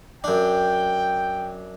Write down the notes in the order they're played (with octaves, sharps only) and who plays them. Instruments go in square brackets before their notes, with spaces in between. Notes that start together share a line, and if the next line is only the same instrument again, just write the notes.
[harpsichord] F#2 D4 [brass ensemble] G5